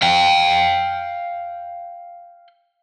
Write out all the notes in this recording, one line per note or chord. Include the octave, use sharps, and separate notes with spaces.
F5 G5